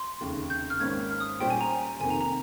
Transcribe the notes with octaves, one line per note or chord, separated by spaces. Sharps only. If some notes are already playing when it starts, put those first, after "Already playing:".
Already playing: C6
F1 D#2 C#3
G6
F6
G#1 G#2 D#3 A#3 C#4 G#6
F6
D#6
A#2 G3 C#4 G4 C5 G5
G#5
A#5
G#5
F1 F2 C3 D#3 A#3 G#5
A#5
A#5